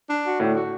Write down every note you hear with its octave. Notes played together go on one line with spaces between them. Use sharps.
D4
F#4
A2 D3
F#4